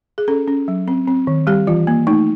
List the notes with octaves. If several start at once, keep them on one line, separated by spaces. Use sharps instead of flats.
G#4
C#4 A4
C#4
F#3
C4
C4
D#3
G3 G4
E3 F4
A#3
A3 D#4